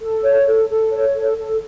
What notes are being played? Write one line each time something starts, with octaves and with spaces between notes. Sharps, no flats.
A4
C#5
A4
A4
C#5
A4
A4